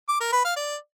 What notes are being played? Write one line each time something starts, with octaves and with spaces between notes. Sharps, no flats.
D6
A#4
B4
F5
D5